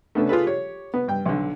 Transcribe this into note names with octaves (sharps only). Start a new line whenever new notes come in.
A3 B3 C#4 D4 A4
F4 G#4 A4 B4
G4 C#5
B3
G2 G5
B1 D3